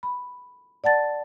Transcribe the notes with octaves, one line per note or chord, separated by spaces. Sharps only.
B5
D5 F#5 A5 A6